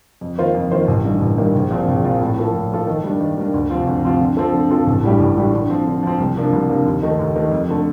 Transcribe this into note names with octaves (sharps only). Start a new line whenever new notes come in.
F2
D#3 A#3 F4 C5
F2
D#3 A#3 F4 C5
A1
G2 D#3 A#3
A1
G2 D#3 A#3
A#1
A#2 F3 C4 F4
A#1
A#2 F3 C4 F4
A2
F3 A#3 F4 A4
A2
F3 A#3 F4 A4
D#3
G3 A#3 D4
D#3
G3 A#3 D4
D2
C3 F3 C4 F4
D2
C3 F3 C4 F4
D3
F3 C4 F4 A4
D3
F3 C4 F4 A4
A1
A2 G3 D4 G4
A1
A2 G3 D4 G4
D3
F3 C4
D3
F3 C4
C2
C3 F3 A#3 D4
C2
C3 F3 A#3 D4
D#2
D#3 A3 D#4
D#2
D#3 A3 D#4
F2
D3 A3